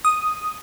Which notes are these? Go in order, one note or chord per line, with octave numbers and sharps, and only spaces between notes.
D#6